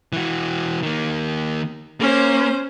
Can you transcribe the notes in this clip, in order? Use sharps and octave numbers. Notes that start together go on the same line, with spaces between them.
E3 F#4
D#3 A#3
A#3 C#4 C5